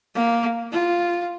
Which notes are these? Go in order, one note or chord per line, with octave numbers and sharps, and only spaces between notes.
A#3
F4